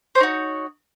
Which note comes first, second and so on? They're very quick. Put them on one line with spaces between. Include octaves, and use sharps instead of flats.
C5 C#5 D#4 F#4